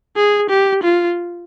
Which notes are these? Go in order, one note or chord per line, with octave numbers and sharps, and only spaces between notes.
G#4
G4
F4